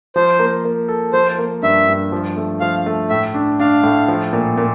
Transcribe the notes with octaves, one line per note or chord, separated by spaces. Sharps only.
F3 C5
A#3
A#3
A4
F3 C5
A#3
G2 E5
G2
F3
A3
F3 F5
A3
A2 E5
D4
D4 F5
A2
F3
A#2
A#2